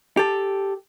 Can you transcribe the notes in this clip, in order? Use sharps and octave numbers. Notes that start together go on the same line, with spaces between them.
G4 A4